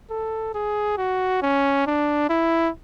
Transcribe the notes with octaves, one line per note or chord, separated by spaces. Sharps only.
A4
G#4
F#4
C#4
D4
E4